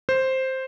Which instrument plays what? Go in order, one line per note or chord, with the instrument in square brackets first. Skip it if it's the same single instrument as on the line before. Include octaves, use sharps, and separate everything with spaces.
[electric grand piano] C5